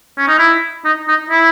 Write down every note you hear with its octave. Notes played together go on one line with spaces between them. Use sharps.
C#4
D#4
E4
D#4
D#4
E4